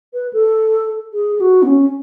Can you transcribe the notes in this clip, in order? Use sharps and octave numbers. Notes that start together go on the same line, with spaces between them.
B4
A4
G#4
G#4
F#4
B3
C#4